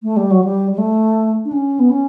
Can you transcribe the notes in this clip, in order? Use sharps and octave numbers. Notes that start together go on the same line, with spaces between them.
A3
G3
F#3
G3
G3
A3
D4
C#4
B3
C#4